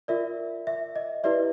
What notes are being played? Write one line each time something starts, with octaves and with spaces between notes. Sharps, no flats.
F4 A#4 D5 E5
E5
D#5
E4 G4 B4 D5 E5